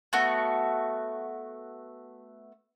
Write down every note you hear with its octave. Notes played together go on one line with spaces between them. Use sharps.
A3 B3 F#4